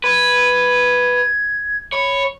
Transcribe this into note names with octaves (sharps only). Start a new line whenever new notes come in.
B4 G#6
C#5 B5